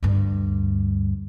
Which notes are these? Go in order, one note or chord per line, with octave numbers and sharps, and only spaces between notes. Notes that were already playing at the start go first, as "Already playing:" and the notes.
D2 G2